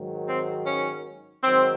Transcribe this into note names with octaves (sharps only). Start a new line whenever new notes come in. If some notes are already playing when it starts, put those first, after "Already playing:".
Already playing: G#2 D#3 F#3
C4
C#4
G#2 D#3 F#3 C4